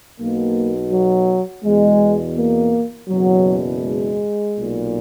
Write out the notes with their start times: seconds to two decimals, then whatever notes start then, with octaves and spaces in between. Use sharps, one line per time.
0.20 B1 B2 A#3
0.93 F#3
1.65 E2 B2 G#3
2.37 A#3
3.09 F#1 E2 B2 F#3
3.82 G#3
4.54 B1 A#2